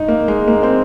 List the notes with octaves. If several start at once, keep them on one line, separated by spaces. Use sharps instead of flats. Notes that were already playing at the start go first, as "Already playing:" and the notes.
Already playing: G#2 D#4
A#3
G#3
A#3
C4